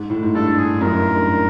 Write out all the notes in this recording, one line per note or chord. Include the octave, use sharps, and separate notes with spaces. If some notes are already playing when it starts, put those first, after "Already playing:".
Already playing: G#2
A2
G#2
G2 A4
G#4
F#2 A#4
G2